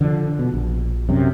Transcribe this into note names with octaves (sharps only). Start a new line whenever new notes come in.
D3 F3
B2
A#1
F#2 C3